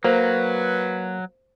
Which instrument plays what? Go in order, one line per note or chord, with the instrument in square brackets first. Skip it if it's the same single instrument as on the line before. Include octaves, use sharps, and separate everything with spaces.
[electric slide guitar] F#3 [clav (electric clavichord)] A#3 [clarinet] B4 [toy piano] C5